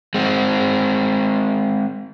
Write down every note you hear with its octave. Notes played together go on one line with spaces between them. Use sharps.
G#3 C4